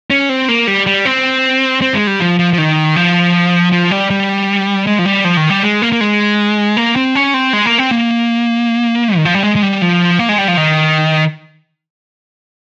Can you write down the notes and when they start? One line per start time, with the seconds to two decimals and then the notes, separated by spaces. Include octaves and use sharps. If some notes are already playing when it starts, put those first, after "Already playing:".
0.10 C#4
0.29 C4
0.48 A#3
0.67 G3
0.86 G3
1.05 C4
1.82 C4
1.94 G#3
2.07 G3
2.20 F3
2.39 F3
2.53 F3
2.58 D#3
2.96 F3
3.72 F3
3.91 G3
4.10 G3
4.87 G#3
4.99 F3
5.05 G3
5.24 F3
5.37 D#3
5.50 G3
5.63 G#3
5.82 A#3
5.93 A#3
6.01 G#3
6.77 A#3
6.96 C4
7.15 C#4
7.34 C4
7.53 G#3
7.66 A#3
7.78 C4
7.91 A#3
9.16 D#3
9.25 F3
9.34 G3
9.43 G#3
9.56 G#3
9.62 G3
9.82 F3
10.19 A#3
10.29 G#3
10.38 G3
10.48 F3
10.57 D#3